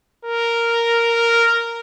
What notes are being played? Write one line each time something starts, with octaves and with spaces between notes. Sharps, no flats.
A#4